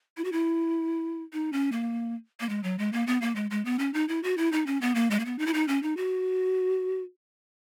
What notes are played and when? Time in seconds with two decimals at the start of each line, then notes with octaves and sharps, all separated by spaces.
0.17 E4
0.24 F#4
0.32 E4
1.33 D#4
1.53 C#4
1.72 A#3
2.40 A#3
2.49 G#3
2.63 F#3
2.79 G#3
2.93 A#3
3.07 B3
3.22 A#3
3.35 G#3
3.51 G#3
3.65 B3
3.79 C#4
3.94 D#4
4.09 E4
4.23 F#4
4.37 E4
4.52 D#4
4.67 C#4
4.81 B3
4.95 A#3
5.11 G#3
5.19 A#3
5.25 B3
5.39 D#4
5.47 E4
5.54 D#4
5.68 C#4
5.83 D#4
5.97 F#4